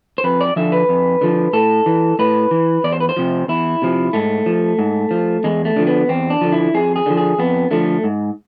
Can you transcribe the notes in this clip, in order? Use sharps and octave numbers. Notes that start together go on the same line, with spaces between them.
C5
F2 B4
D5
D3 F3 E5
B4
F2
D3 F3
A2 A4
E3
A2 B4
E3
E2 D5
C5
B4
C5
C3 F3
E2 E4
C3 F3
G#2 A3
F3
G#2
F3
E2 G#3
A3
D3 F3
B3
E2 C4
D4
D3 F3
E4
F2 G#4
G#4
D3 F3
G#4
F2 B3
D3 F3 A3
G#2